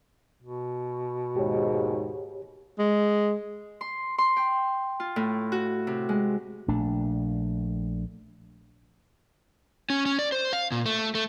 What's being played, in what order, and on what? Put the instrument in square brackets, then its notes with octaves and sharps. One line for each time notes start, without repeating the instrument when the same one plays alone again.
[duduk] B2
[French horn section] D#2 G#2 [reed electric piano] G4 C#5
[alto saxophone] G#3
[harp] C6
C6
G5
F4
A2
F#4
C3
G#3
[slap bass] A#1 A3 D4
[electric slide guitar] C#4
C#4
D5
C5
F5
A#2
A3
A3